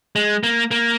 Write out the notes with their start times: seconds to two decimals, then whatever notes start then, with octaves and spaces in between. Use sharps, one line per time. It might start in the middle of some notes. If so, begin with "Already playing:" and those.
0.16 G#3
0.43 A#3
0.71 A#3